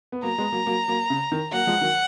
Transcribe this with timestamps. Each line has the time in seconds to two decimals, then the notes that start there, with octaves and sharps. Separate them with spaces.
0.12 B3
0.23 F#3 A#3 A#5
0.38 G#3 B3
0.52 F#3 A#3
0.66 F#3 A#3
0.88 F#3 A#3
1.10 C#3
1.32 D#3
1.52 F#3 A#3 F#5
1.67 F3 G#3
1.81 D#3 F#3